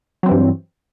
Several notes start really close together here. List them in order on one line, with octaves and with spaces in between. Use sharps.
F#3 C4 E3 G2